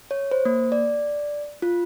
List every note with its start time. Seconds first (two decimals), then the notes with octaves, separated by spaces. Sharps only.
0.11 C#5
0.31 C5
0.45 A#3
0.72 D5
1.62 F4